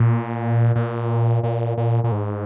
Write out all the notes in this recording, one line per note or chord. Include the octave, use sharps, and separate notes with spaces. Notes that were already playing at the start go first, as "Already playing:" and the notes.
Already playing: A#2
A#2
A#2
A#2
A#2
G#2